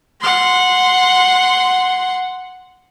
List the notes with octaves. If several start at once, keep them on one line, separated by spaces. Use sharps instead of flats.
F#5 C6